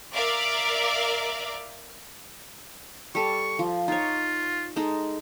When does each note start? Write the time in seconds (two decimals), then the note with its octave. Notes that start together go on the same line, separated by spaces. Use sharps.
0.14 A#4 D5 E5 F5 D6
3.15 G3 A4 C#6
3.59 F3
3.88 D#4 F4 C#5
4.76 G#3 D#4 A4